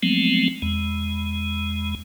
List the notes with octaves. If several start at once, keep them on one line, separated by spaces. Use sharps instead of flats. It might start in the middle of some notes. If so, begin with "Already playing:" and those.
F3 F#3 G#3 A3 B3 C4
E2 G#3